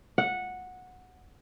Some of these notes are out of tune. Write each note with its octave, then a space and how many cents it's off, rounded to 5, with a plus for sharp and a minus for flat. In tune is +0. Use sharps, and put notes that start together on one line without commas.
F#5 -10